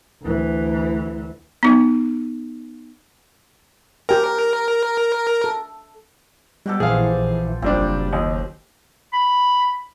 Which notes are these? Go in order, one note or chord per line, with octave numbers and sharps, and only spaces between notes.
D2 E3
B3 D#4
G4 A#4 G5 G#5
A4
B2 G3 G4 A4
A#1 E3 F3 G#4 F5
F#1 A#2 G3 C4 D4 G4
D#2 D#5
B5